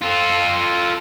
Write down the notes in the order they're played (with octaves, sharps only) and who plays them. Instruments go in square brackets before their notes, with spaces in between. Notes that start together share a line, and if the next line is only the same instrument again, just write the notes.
[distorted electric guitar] F4 A4